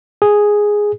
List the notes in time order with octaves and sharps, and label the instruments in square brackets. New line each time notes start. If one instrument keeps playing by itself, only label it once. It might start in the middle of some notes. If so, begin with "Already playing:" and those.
[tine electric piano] G#4